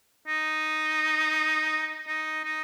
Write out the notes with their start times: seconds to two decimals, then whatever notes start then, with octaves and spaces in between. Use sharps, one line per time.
0.28 D#4
2.07 D#4
2.45 D#4